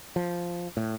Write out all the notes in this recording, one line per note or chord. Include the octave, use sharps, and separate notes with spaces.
F3
A2